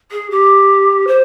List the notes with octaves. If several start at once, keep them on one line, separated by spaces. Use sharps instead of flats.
G#4
G4
C5